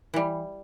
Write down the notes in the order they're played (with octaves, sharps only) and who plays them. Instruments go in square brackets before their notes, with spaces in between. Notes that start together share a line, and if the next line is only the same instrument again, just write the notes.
[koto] E3 G3